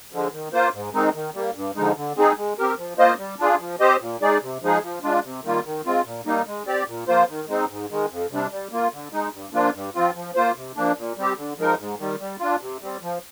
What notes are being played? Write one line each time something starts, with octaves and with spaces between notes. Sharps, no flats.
D3 F3 G#3
D#3
A#3 F4 C5
G#2
D#3 G#3 C4 D#4
D#3
G3 A#3
G2
D3 F3 G#3 D#4
D3
G#3 C4 D#4 G#4
G#3
C4 G4 A#4
F3
A#3 F4 C5 D#5
G3
D4 F4 G#4
F3
C4 G4 C5 D#5
A#2
G#3 D#4 G#4 D5
C3
F3 G#3 D#4 G#4
F3
G#3 D4 F4
C3
D#3 G3 A#3 F4
D#3
G#3 C4 F4
A#2
G3 A#3 D#4
G#3
C4 G4 D5
A#2
F3 A#3 F4 C5
D#3
G#3 C4 D#4
G#2
D#3 G#3
F2
C3 G3 D4
G3
A#3 F4
D3
G#3 D#4
G2
F3 A#3 D4 F4
G2
F3 C4 F4
F3
A#3 F4 C5
C3
F3 A#3 D4
A#2
G3 C4 G4
D3
F3 G#3 D#4 A#4
G#2
D#3 G3
G3
D4 F4
C3
G3 C4
F3